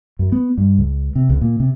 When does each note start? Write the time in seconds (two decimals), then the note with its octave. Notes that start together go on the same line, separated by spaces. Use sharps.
0.19 F#2
0.32 B3
0.58 G2
0.78 C#2
1.15 C3
1.29 C#2
1.41 A#2
1.60 C3